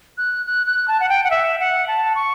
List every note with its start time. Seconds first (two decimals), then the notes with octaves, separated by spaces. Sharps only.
0.18 F#6
0.46 F#6
0.67 F#6
0.88 A5
1.00 F#5
1.09 G5
1.24 F#5
1.31 E5
1.60 F#5
1.88 A5
2.15 C#6